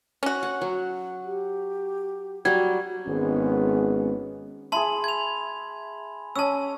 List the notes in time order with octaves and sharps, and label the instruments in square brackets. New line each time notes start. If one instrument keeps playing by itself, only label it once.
[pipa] C#4 F#4
[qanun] F#5
F#3
[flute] G4
[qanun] F#3 G3 [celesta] G#6
[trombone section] G#1 G#3 B3 C#4
[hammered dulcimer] E4 G#4 [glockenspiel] A5 C6 F#7
[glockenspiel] G#6 F7
[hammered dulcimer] C#4 D#5 [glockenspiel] A5 E6